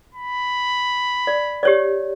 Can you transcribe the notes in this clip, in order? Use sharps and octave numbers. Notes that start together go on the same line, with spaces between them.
B5
D5
G4 C#5 D5